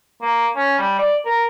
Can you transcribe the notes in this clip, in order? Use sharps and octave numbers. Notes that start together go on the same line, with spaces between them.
A#3
C#4
G3
D5
A#4